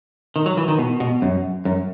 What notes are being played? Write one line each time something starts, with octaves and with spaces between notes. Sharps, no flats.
D#3
F#3
E3
D#3
B2
B2
F#2
F#2